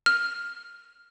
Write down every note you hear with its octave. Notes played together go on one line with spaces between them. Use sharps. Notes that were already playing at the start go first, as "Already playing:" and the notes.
F6